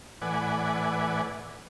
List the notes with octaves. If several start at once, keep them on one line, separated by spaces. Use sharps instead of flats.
A2 E3 B4 D5 F#5 G#5